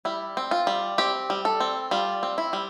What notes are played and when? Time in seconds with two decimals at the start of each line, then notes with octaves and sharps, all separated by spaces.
0.05 G3 E4
0.37 C4
0.51 F4
0.67 G3
0.98 C4 G4
1.30 G3
1.45 A4
1.60 C4
1.91 G3 F4
2.23 C4
2.38 E4
2.53 G3